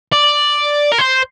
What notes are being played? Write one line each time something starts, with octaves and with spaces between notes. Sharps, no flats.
D5
A#4
C5